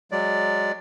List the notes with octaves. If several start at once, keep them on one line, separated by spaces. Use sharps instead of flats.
F#3 G#3 D5